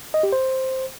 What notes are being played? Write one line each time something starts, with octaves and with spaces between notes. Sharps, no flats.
D#5
G4
C5